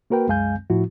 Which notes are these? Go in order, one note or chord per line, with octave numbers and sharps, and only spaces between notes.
A#3 F#4 A#4 B4 G5
C2 F#2 G#3 F5 G#5 G6
A2 F3 E4 F#4